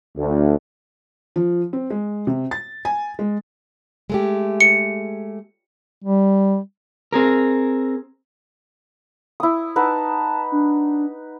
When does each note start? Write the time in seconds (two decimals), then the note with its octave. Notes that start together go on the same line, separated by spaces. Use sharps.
0.16 D2
1.36 F3
1.73 C4
1.90 G#3
2.27 C3
2.51 A6
2.85 G#5
3.19 G#3
4.10 G#3 A3 G4
4.61 C#7
6.04 G3
7.13 C4 G#4 A#4
9.40 E4 D#6
9.76 D#4 B4 F#5 A5
10.52 D4